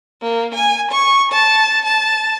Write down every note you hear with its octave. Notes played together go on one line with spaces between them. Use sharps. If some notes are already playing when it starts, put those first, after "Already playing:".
A#3
G#5
C#6
A5
A5